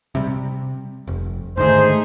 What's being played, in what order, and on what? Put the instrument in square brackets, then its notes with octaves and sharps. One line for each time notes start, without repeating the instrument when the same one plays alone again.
[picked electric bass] C3 G3
F1
[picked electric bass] G#2 D3 D#3 [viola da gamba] A3 D#4 G#4 [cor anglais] C5